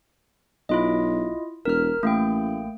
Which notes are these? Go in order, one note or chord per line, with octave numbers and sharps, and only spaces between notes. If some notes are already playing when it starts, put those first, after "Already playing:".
B1 E4 F4 D#5
E1 A#4 F6
A1 A3 A#3 G5